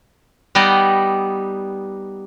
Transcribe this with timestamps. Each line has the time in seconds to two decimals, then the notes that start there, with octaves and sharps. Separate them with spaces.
0.55 G3 B3 D#4 D5 D#5